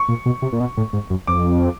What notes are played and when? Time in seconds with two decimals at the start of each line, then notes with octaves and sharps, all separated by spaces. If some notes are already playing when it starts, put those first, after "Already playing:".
Already playing: C#6
0.09 A#2
0.26 B2
0.42 C3
0.52 A#2
0.60 B2
0.77 A2
0.93 G#2
1.10 F#2
1.27 F2 D6